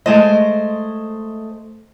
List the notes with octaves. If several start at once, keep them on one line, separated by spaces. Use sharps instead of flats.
G#3 A3 C5 D#5